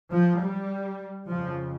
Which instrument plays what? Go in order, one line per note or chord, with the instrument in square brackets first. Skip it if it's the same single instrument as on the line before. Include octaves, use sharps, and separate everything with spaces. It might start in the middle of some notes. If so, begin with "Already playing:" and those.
[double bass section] F3
G3
F2 C#3 F3